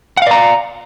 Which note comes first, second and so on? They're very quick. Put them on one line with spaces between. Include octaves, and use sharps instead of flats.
F#5 F5 D5 A#5